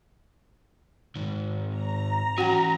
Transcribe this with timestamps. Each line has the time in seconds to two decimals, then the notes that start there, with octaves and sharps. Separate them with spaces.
1.15 G#2 D#3
1.69 A#5
2.38 E3 C#4 F#4 F#5 G5